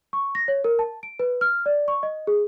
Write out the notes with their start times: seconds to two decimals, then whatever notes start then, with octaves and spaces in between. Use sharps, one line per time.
0.13 C#6
0.35 A#6
0.48 C#5
0.64 A#4
0.79 A5
1.03 D7
1.19 B4
1.41 F6
1.66 D5
1.88 C#6
2.03 D#5
2.27 G#4